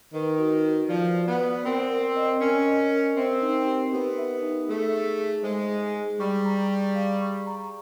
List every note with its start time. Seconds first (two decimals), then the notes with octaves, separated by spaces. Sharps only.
0.13 D#3 B4
0.39 F#4
0.64 F#4
0.89 F3 D5
1.15 D5
1.27 B3
1.40 D5
1.65 C4 A#4
1.90 A#4
2.16 D#5
2.41 C#4 A#4
2.66 D#5
2.91 A#4
3.17 C4 E5
3.42 D#4
3.66 G4
3.92 B3 G4
4.18 E5
4.42 D#4
4.68 A3 G#4
4.94 G#4
5.18 G#4
5.43 G#3 C5
5.69 G#4
5.95 G#4
6.20 G3 C#6
6.45 A#5
6.70 C#6
6.95 F5
7.21 C#6
7.47 A#5